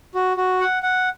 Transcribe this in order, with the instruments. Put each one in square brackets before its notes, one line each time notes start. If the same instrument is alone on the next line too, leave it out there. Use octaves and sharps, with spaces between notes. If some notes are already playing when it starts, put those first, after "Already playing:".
[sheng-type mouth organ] F#4
F#4
F#5
F#5